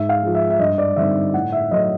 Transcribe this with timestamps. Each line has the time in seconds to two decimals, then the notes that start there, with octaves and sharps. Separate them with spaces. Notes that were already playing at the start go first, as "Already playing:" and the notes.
Already playing: G#2 E5
0.09 F5
0.22 F3 G#3
0.35 E5
0.50 E5
0.59 G2 D#5
0.78 D5
0.96 D3 G3 C4 D#4 E5
1.34 A2 F#5
1.52 E5
1.71 F#3 A3 D#5